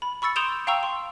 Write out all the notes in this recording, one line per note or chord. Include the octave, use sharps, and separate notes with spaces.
B5
B5 C#6 E6 A6 C#7
C6 D#6 G6 D7 E7 F7
F5 G5 A#5 C#6 E6
C6